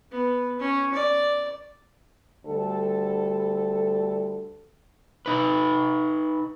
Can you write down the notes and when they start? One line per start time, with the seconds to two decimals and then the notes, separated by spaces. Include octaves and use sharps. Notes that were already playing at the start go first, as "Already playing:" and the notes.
0.12 B3
0.60 C#4
0.94 D5
2.46 D2 G3 A4
5.26 D#4 B4